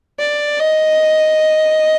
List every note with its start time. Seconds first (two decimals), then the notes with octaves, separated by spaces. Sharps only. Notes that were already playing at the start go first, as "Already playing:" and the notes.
0.19 D5
0.59 D#5